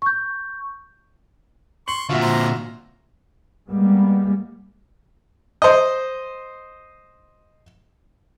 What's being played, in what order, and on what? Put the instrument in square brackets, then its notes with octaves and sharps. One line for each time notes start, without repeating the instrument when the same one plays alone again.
[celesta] C#6 G6
[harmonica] C6 C#6 [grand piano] F#7
[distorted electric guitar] A#2 D3 [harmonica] F3 [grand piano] F4 F#4 E5
[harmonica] C5 A#5
[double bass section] G3 G#3 A#3 B3
[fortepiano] C5 D#5